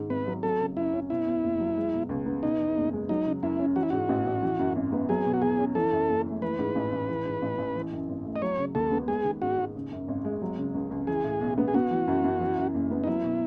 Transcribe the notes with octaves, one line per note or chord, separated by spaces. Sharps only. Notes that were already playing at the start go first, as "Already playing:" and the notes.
Already playing: G#2 D#3
G#1 B4
F#3
F#3 A4
C#3
F#2 E4
C#4
B2 E4
E2
F#1
F#3
G#3
B2
C#2
B3
B2 D#4
E2
F#1
G#3
F#3 D#4
C#3
F#2 E4
C#4
E3 F#4
E4
G#2 F#4
A1
A1
E3
F#2
G#1
B3
F#3 G#4
B2
F#4
E2 G#4
C#4
E3 A4
F#2
F#1
A3
E3 B4
G#2
A1
A1
E3
G#2
A1
A1
E3
F#2
G#1
A3
D#5
F#3 C#5
C#3
D#2 A4
B3
G#3 G#4
D#3
G#2 F#4
G#2
C#3
F#2
G#1
G#3
F#3
C#3
C#2
C#2
E3 G#4
A2
B1
B3
G#4
B3 F#4
E3
F#2
F#2
E3
F#2
F#1
B3
D#4
F#3 E4
B2